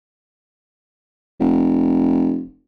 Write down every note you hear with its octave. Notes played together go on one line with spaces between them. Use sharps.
F1